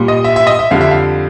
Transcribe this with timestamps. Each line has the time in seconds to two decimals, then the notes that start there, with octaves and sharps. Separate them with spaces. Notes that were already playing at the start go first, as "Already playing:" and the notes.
Already playing: A#2 G3
0.08 D#5
0.24 E5
0.36 E5
0.47 D#5
0.59 E5
0.71 F2 D3 G3 F5
0.81 E5
0.91 F5